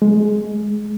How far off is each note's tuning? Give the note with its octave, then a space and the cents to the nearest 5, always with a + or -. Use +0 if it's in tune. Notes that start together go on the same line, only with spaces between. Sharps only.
G#3 +15